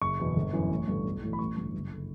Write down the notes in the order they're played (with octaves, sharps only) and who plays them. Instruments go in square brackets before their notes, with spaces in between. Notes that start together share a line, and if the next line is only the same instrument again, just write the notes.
[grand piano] F#1 C#6
E2 B2
G1
F#2 E3
A1
G2 D3
B1
A2 E3
B5
A1 C#6
G2 D3
F#1
D3